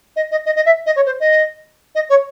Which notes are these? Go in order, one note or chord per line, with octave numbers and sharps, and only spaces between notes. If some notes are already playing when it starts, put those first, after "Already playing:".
D#5
D#5
D#5
D#5
E5
D#5
C#5
C5
D#5
D#5
C#5